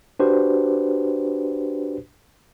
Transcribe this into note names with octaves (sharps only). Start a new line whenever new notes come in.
D4 F#4 G4 B4 C5